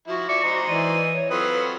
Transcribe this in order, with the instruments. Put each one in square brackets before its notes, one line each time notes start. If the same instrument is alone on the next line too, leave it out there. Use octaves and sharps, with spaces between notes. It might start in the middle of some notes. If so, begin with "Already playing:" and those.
[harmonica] F3 E4 [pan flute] F#4
[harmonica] D5 E5 D6 [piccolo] C#7
[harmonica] C5 D#5 A#5
[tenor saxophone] E3 [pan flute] D5 [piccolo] D#7
[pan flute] C#5
[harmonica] F#3 C4 F4 [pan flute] A4 [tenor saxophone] B4 [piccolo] D#6